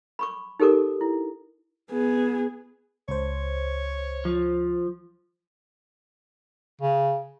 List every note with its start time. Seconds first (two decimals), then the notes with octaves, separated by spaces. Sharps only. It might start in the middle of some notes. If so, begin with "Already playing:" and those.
0.19 B5 C#6 D6
0.60 D#4 G4 A4 A#4 D6
1.01 E4
1.91 B3 G#4
3.08 C#2 C5 C#5
4.25 F3
6.81 C#3